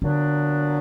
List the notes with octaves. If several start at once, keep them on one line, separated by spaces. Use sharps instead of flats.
A#2 D3 F#3 B3 D4